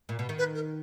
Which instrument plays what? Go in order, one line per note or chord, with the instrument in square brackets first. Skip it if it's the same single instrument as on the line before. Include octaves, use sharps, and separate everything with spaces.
[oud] A#2
B2
D#3
[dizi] B4
A#4